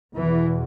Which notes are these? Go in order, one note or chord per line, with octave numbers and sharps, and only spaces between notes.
E2 B2 E3